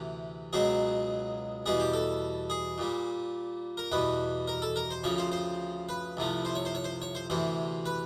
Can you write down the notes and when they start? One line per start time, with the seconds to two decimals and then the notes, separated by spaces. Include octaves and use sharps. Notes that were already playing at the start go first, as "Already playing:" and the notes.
Already playing: D2 C3 E3 G4
0.53 C#2 B2 F#3 G#4
1.66 E2 B2 G3 G#4
1.80 G4
1.93 A4
2.50 G#4
2.78 A#2 G3
3.77 A#4
3.92 E2 B2 G3 B4
4.48 A#4
4.62 A4
4.76 A#4
4.91 C5
5.04 D2 C#3 F3 C#5
5.18 C5
5.32 C5
5.89 B4
6.17 C2 C3 F3 A3
6.45 C5
6.55 C#5
6.65 C5
6.75 C#5
6.84 C5
7.02 C#5
7.15 C5
7.30 D2 C3 E3 C5
7.86 B4